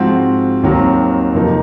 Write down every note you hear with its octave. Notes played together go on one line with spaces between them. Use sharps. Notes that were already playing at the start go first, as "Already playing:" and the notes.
Already playing: G#2 F3 C4 F#4 C5
D#2 D#3 F#3 C4
F2 C3 F3 A#3 D#4